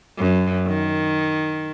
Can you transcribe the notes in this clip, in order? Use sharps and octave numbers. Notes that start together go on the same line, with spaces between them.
F#2
D#3